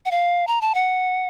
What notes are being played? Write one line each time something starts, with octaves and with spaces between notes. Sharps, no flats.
F#5
F5
A#5
A5
F#5